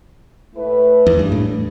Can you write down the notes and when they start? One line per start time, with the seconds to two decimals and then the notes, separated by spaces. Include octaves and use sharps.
0.55 A2 A3 E4 B4
1.07 E2
1.19 G2
1.32 A2